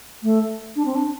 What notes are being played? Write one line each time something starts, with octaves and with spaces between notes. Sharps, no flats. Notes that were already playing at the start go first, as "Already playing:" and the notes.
A3
D4
C4
D4